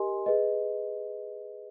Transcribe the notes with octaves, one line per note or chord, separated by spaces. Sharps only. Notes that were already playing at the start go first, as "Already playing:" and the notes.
Already playing: G4 A#4 D#5 G#5 C6
G#4 B4 D#5